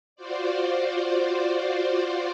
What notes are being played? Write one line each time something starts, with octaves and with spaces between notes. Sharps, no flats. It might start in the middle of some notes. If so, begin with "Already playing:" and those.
F4 F#4 C5 D5